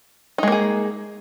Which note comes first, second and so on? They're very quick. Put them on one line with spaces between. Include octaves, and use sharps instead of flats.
D#4 G#3 A#3 G#4